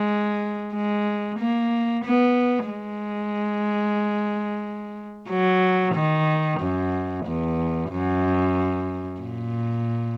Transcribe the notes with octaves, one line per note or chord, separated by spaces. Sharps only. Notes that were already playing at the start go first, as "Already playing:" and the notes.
Already playing: G#3
G#3
A#3
B3
G#3
F#3
D#3
F#2
E2
F#2
A#2